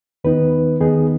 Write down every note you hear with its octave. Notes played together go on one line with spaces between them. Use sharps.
D#2 D#3 B3 D#4 B4
D#2 D#3 B3 D#4 G#4